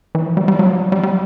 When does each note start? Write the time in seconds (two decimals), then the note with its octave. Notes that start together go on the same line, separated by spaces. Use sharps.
0.15 E3
0.26 F3
0.37 G3
0.48 G3
0.59 F#3
0.70 F3
0.92 G3
1.03 G3